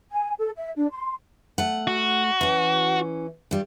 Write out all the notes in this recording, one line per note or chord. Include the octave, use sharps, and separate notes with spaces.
G#5
A4
E5
D4
C6
A3 F#5
F#4
E3 C#4
G2 G3